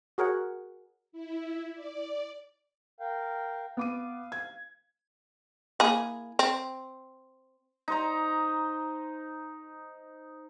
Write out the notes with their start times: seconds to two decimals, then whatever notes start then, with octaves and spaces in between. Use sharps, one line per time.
0.18 F#4 G#4 A#4 C#5 F#5
1.12 E4
1.74 D5
3.00 A#4 F5 G5
3.77 B3 F5 D6 D#7
4.32 G#6
5.80 A#3 E4 G#4
6.39 C4
7.88 D#4 C5 A#5